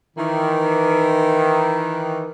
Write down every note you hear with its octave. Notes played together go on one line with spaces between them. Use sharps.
D#3 E3